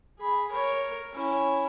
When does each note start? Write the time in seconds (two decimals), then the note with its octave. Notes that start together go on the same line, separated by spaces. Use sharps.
0.19 G#4 B5
0.51 A#4 C#5
1.13 C#4 E4